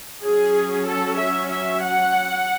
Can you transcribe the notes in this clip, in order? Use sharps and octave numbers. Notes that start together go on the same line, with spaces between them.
F#3 C#4 G#4
A4
E5
E5
F#5